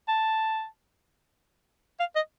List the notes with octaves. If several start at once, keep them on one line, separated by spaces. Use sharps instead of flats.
A5
F5
D#5